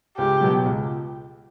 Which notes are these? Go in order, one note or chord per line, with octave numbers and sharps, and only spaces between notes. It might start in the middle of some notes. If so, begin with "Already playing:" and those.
C#2 G4
B2 F#3
C#2